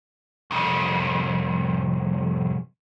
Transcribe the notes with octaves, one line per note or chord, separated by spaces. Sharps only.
C2 F2